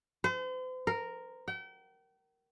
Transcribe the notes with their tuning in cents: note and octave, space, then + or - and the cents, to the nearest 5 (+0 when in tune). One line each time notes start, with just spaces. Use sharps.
C5 -40
A#4 -5
G5 -40